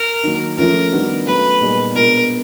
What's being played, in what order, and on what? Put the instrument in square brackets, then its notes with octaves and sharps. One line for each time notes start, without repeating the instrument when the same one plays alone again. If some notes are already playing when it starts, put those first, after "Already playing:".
Already playing: [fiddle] A#4
[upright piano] D#3 F#3 A#3
[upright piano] F3 A3 C#4 F4 [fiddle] A#4
[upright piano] D#3 G3 B3 D4 F#4
[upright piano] F#3 A3 C#4 [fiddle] B4
[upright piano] A#2 G3 B3 D#4 G#4
[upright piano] B2 G#3 B3 D4 F4 [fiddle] A#4